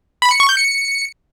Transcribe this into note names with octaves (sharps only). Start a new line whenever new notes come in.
B5
C#7
C#6
G6
C#7